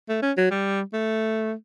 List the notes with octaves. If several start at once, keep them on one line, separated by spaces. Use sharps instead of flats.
A3
C#4
F#3
G3
A3